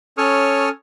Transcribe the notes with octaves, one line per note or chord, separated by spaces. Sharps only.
C#4 A4 C#5 C#6 D#6 F6